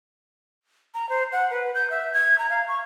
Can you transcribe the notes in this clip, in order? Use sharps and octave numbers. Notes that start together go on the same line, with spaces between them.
A#5
C5
F#5
B4
G6
E5
G#6
A#5
F5
C#6